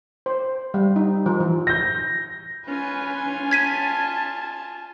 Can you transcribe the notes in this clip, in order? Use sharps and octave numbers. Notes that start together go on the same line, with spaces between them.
C5
G3
D#4
F3
E3
G6 A#6
C#4 F4 B4 G#5
A5 G#6 B6 D#7